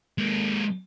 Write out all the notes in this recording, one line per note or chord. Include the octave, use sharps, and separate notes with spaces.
G#3 A#3